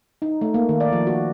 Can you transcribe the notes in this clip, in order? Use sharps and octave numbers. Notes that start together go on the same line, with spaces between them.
D#4
A3
A#3
D#3
D5
F3
F#4